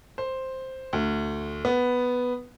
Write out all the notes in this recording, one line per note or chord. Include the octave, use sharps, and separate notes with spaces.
C5
D2
B3